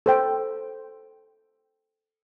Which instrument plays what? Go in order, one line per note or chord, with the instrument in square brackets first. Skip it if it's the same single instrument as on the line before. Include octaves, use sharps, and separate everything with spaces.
[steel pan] A4 C5 G5